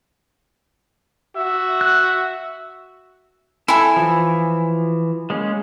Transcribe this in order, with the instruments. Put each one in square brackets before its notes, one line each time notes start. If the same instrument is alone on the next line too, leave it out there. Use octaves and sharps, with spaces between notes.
[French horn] F#4 [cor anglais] E5
[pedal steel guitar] F#6
[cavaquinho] E4 G#5 [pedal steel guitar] A4
[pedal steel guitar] E3 F3
G#3 A#3 C#4